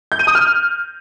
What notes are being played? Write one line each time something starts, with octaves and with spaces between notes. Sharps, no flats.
G6
D#7
D#6
F6